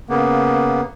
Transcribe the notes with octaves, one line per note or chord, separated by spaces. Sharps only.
C#3 A#3 B3